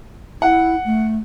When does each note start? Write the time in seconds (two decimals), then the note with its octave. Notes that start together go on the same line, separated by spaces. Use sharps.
0.42 E4 F#5
0.85 A3